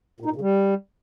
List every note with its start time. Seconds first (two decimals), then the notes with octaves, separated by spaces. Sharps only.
0.20 A#2
0.26 D#4
0.31 A#2
0.36 C#3
0.41 G3